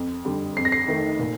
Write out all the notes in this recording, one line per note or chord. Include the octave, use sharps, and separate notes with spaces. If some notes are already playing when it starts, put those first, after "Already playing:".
Already playing: F2
D3 G3
F2 C7
A#6
C7
D#3 A3
A#2